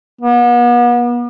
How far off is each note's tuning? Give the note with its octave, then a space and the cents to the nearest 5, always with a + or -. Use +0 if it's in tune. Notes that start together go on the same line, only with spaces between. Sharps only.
B3 -40